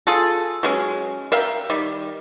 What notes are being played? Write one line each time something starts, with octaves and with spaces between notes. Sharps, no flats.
F4 G#4 A4
F#3 G#3 C#4
A#4 E5 F5 G5
D#3 G3